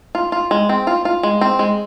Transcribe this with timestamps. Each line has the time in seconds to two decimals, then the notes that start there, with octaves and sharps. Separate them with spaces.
0.15 F4
0.32 F4
0.51 G#3
0.69 C4
0.87 F4
1.05 F4
1.23 G#3
1.41 C4
1.59 G#3